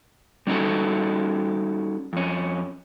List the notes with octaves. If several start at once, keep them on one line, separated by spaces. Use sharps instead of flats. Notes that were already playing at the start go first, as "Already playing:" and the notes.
G3 C#4 D#4 F#4 A4
F2 C#4